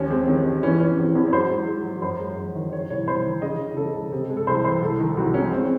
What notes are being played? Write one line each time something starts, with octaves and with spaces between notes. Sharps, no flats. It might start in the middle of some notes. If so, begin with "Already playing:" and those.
Already playing: D#2 C#4
G#3 C4
D#3 C4
D#3
E3 C#4
E3 C#4
E2 C4
E2 C#4
C#5
F#3 C5
G#2
G#2
F#3
F#2 C5
G#3
F#2
D#3
D#3 C#5
C2 C#5
C2 C5
D#3
C#3 D#5
C#3
C#3 A4
C#2
C3
G#3
A4
C2 C5
E3 C5
C2 A4
D#3
C2 F#4
G#3 C#4
G#3 C4